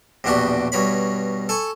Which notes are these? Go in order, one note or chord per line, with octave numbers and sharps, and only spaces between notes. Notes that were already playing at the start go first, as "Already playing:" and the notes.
A#1 E2 B2 D4 F#4 G4
G2 B2 C#5 B5
A4 G#5 C#6